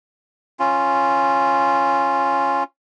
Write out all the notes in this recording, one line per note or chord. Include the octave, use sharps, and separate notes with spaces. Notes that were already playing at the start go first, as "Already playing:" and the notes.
C#4 F4